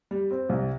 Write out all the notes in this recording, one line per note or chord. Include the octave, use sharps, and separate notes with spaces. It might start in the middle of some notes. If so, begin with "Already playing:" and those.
G3
C4
C2